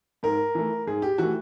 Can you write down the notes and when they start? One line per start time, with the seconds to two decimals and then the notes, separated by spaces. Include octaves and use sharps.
0.23 G#2 A#4
0.55 E3 A3
0.87 G#2 G#4
1.02 G4
1.18 E3 A3 F#4